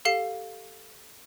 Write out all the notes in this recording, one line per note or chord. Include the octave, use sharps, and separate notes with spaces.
G4 A4 F5 C7 E7